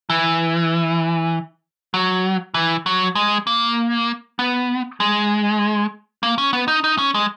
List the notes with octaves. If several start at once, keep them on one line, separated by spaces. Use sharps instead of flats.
E3
F#3
E3
F#3
G#3
A#3
B3
G#3
A#3
C#4
B3
D#4
D#4
C#4
G#3